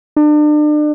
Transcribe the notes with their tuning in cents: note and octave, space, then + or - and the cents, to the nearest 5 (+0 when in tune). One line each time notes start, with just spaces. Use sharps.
D4 +35